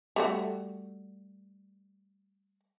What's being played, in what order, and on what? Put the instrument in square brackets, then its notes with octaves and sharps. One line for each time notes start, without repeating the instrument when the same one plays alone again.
[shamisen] G3 A3 F#4